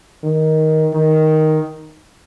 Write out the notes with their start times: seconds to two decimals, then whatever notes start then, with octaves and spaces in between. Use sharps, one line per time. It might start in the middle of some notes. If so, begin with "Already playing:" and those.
0.23 D#3
0.94 D#3